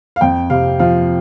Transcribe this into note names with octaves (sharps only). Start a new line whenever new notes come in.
F5
F2 G5
C3 F5
F3 F5